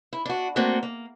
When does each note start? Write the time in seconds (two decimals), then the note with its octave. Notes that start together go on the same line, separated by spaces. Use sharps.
0.13 E4
0.25 D4 F#4
0.56 A3 A#3 C4 D4 F#4
0.83 A#3